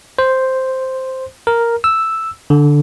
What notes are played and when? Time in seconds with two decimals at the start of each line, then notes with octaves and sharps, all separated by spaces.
0.19 C5
1.47 A#4
1.84 E6
2.50 D3